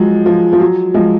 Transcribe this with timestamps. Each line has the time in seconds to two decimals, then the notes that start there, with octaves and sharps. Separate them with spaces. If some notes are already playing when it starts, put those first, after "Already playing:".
Already playing: F3 F#3 G#3
0.26 F3
0.53 F3
0.60 F#3
0.94 F3 G#3